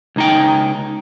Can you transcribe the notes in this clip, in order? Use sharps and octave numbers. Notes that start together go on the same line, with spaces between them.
C#2 D#4 G5